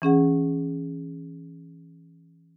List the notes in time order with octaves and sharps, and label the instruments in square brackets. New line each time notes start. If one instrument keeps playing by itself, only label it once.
[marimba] E3 C#4 G#4 F#5